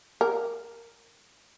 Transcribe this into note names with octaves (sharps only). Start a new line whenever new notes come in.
A#4